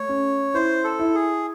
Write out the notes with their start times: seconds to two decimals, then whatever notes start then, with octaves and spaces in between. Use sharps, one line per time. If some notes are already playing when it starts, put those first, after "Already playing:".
Already playing: A3 C#5
0.09 C#4
0.54 E4 C5
0.84 A4
0.99 E4
1.15 G#4